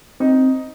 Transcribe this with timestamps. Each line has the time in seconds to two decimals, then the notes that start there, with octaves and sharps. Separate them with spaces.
0.20 C4 D#4